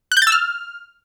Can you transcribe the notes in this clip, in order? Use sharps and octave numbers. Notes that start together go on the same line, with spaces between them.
F#6
G6
A6
E6
F6